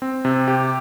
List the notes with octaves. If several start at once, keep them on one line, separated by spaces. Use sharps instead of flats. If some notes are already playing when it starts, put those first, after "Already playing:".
C4
C3
G4